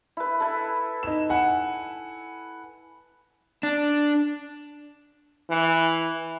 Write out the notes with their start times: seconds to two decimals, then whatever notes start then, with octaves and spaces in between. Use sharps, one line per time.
0.17 E4 B4
0.40 E4 A4
1.03 D#4 E7
1.30 F#5 G#5
3.63 D4
5.51 E3